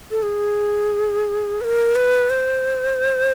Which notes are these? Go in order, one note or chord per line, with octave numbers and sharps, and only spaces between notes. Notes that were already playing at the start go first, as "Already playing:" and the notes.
A4
G#4
B4
A#4
B4
C5